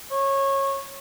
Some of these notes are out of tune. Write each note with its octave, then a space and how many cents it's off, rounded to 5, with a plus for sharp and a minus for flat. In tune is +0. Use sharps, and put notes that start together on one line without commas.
C#5 -20